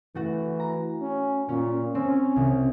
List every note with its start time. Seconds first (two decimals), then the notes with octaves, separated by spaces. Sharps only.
0.15 E3 A3 F#4
0.60 A#5
1.01 C#4
1.49 A#2 C#4
1.95 C4 C#4
2.36 C2